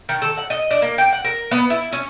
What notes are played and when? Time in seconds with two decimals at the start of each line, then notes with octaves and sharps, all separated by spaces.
0.09 D#3
0.22 A4
0.38 F#5
0.50 D#5
0.71 D4
0.82 A#3
0.98 G5
1.13 F#5
1.24 A#4
1.51 B3
1.70 E4
1.93 C#4